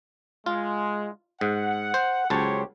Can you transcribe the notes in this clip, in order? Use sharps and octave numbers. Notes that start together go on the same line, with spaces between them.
G#3 F4
G#2 F#5
C5
C#2 F#3 G4 C5 C#5 A5